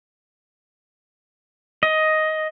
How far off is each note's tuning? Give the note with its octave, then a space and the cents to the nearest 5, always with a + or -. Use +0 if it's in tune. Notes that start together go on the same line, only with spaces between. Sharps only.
D#5 +10